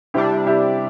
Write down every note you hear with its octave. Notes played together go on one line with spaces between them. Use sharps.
C3 G3 D4 E4 G4
E4 G4